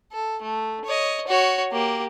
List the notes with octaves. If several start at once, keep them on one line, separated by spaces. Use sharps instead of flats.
A4
A3
C#5 D#5
F#4 C#5
A#3 G4